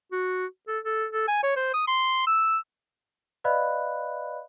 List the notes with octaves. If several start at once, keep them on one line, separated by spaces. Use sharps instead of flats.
F#4
A4
A4
A4
G#5
C#5
C5
D#6
C6
E6
B4 D5 D#5 F5 B5 F#6